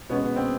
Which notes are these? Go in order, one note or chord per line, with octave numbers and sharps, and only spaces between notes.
B2 G#3 B3 C#4
B3
C4